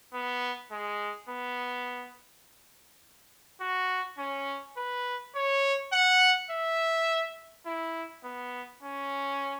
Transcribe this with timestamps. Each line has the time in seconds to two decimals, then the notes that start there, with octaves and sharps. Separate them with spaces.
0.13 B3
0.71 G#3
1.29 B3
3.61 F#4
4.18 C#4
4.77 B4
5.35 C#5
5.93 F#5
6.51 E5
7.66 E4
8.24 B3
8.82 C#4